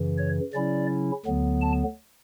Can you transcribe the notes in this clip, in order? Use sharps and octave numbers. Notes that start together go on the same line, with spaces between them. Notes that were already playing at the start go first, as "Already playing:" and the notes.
Already playing: F#2 C#3 E3
C#5
C#3 F#3 C#4 E4 D5
D2 D3 F#3 B3
A5